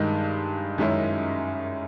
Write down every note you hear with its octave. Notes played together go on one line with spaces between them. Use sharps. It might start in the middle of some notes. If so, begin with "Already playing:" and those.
Already playing: G2 D#3 G#3
F#2 D#3 G#3 C#4 E4